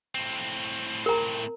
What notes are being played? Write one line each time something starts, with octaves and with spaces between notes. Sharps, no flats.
A2 C4
A#4 A#5